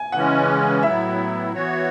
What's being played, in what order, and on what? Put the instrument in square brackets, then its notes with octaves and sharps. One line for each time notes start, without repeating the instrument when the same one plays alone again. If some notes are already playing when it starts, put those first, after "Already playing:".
Already playing: [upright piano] G#5
[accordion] C#3 E3 G#3 C#4 [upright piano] F#5
[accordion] A2 F#3 B3 E4 [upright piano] E5
[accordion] E3 B3 F#4 C#5